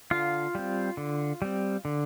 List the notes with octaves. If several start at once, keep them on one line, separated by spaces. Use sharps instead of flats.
D3 F4 F5
G3 C4
D3
G3 C4
D3